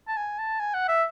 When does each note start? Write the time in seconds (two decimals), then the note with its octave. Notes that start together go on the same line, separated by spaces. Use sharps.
0.08 A5
0.17 G#5
0.39 A5
0.60 G#5
0.74 F#5
0.88 E5